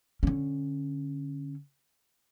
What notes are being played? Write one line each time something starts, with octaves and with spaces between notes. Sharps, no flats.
D3 C#4